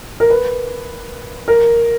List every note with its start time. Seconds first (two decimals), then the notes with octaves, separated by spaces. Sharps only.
0.20 A#4
0.30 B4
1.48 A#4